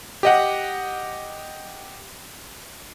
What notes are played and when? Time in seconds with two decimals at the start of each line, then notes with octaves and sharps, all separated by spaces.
0.23 G4 D#5 F#5